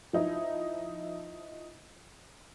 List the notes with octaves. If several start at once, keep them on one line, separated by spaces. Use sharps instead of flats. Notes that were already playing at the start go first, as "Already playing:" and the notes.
F3 D#4 E4